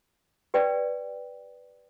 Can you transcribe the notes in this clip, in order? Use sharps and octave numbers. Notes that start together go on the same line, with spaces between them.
G4 B4 D5 G5